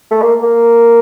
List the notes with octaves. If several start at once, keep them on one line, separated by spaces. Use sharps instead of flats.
A3
A#3
A#3